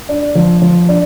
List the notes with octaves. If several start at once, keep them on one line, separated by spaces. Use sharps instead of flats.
D4
F3
F3
D4